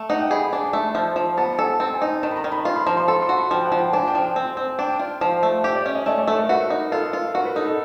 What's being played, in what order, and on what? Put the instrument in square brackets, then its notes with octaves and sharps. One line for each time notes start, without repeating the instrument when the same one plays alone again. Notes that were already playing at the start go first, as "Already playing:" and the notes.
Already playing: [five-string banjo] A3
[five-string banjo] D#4 [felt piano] F#5
[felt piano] G5
[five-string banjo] G#4 [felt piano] B5
[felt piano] B5
[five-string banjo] D4
A3
F3
F3
[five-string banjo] B3 [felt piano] A5
[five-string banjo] A4 [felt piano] G#5
[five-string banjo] C4 [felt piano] A5
[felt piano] G#5
[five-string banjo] D#4
[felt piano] G#5
[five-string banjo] D#3 [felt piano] A5
[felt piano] B5
A#5
[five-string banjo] D#3
[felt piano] B5
[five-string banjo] F4 [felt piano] C6
[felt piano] B5
[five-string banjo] F3 [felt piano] A#5
[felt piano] C6
[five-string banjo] A4 [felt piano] C6
[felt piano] C6
[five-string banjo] F#4
[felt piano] B5
[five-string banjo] F3 [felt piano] G5
[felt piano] F#5
[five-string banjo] F3
[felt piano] G5
[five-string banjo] D4 [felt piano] G#5
[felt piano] G5
[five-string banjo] F3
[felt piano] G5
[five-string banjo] C4
C4
[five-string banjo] D4 [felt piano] G5
[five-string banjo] F4
[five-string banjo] F3 [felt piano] F5
[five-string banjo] A3
[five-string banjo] G4 [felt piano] E5
[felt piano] D5
[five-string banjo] C#4 [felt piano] D#5
[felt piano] D#5
[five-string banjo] A3 [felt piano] D5
[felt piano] C#5
[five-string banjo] A3 [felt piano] A4
[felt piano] A#4
[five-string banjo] F#4 [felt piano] B4
[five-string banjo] D#4 [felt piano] A#4
[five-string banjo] F4 [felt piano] A4
[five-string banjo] F4
[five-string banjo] F#4 [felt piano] A#4
[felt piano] B4
[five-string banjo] D#4 [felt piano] A4
[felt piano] A4